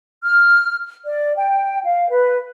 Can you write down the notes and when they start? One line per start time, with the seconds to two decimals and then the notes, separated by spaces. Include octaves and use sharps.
0.23 F6
1.05 D5
1.36 G5
1.84 F5
2.10 B4